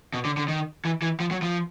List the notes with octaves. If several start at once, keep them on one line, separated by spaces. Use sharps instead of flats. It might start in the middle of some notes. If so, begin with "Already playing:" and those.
B2
D3
D3
D#3
E3
E3
F3
F#3
F3